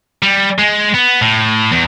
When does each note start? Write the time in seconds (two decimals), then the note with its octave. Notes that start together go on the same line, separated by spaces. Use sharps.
0.23 G3
0.58 G#3
0.94 B3
1.21 A2
1.71 E2